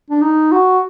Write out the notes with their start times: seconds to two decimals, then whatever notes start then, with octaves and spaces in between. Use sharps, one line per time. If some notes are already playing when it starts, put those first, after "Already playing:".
0.10 D4
0.21 D#4
0.52 F#4